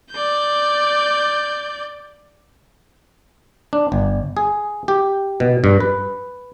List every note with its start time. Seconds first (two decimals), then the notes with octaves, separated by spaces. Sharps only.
0.11 D5 G6
3.73 D4
3.92 G1
4.37 G#4
4.88 G4
5.40 B2
5.64 G2
5.80 B4